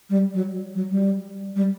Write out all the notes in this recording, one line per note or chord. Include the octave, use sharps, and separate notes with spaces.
G3
F#3
F#3
G3
G3